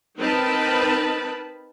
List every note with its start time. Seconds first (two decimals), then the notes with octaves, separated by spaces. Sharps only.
0.19 C4 D#4 A#4 B4 A5 B5